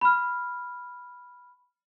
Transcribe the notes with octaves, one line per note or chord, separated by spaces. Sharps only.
B5 F6